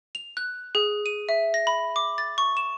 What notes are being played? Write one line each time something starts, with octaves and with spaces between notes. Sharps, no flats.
F7
F#6
G#4
D#7
E5
A#6
B5
D6
A6
C#6
E7